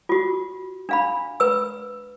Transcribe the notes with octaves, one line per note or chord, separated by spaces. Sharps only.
F4 F#4
D4 F5 B5
B4 E6